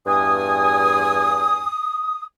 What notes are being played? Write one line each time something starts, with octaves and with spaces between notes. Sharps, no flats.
E2 G2 G#5 D#6